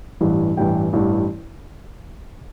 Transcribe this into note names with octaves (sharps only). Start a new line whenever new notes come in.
A1 G2 E3
A1 G2 E3 G5
A1 G2 E3